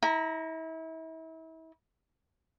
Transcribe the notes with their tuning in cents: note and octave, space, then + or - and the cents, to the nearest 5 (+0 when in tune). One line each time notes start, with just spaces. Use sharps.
E4 -35 A#5 +0